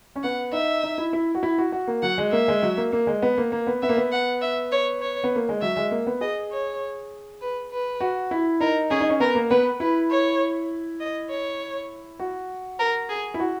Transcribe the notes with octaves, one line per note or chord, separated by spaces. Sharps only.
C#4
B3 F#5
D#4 E5
D#4
E4
E4
F#4
E4
F#4
F#4
A#3
F#3 F#5
G#3
A#3 E5
G#3
F#3
A#3
A#3
G#3
B3
A#3
A#3
B3
B3 E5
A#3
B3
F#5
E5
C#5
C#5
B3
A#3
G#3
F#3 E5
G#3
A#3
B3
G#4 D#5
C#5
B4
B4
F#4
E4
D#4 A#4
C#4 G#4
D#4
C#4
B3 A#4
A#3
B3 B4
E4 B4
C#5
D#5
C#5
F#4
A#4
G#4
E4
F#4